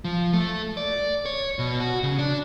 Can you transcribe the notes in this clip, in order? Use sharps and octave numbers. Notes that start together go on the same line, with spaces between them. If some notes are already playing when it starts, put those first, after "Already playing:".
F3
A3
D5
C#5
B2
F#4
C#3
D4